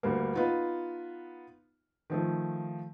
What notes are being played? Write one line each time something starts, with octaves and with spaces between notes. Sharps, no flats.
D2 G2 A#3
B3 D#4 F4
D#3 F3 A3